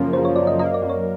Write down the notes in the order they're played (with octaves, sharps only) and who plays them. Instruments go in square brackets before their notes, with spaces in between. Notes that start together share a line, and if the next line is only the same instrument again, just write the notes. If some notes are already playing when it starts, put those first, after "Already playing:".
Already playing: [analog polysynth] F#2 C#3 F3 A#3
[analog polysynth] C#3 [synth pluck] C5
[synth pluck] C#5
[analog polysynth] F#2 [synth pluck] D5
[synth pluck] D#5
[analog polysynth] A#3 [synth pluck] D#5
[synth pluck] D5
[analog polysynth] F#2
[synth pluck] C#5